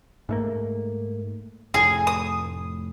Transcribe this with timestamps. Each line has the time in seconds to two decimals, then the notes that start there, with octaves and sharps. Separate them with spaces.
0.29 G#2 A3 A#3
1.74 F1 A2 G#4
2.07 D#6